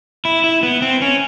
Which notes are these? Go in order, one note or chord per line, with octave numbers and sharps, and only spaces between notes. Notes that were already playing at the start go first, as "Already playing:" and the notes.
E4
E4
B3
C4
C#4